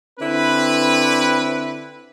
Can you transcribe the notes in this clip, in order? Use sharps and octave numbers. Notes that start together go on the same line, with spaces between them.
D3 C4 E4 B4